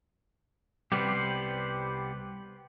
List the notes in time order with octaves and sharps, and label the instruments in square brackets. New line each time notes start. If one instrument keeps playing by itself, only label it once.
[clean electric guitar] C2 G3 B3 [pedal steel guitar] G4 B4 C5